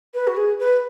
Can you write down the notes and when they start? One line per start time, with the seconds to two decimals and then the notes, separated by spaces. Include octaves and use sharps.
0.14 B4
0.27 F#4
0.36 G#4
0.59 B4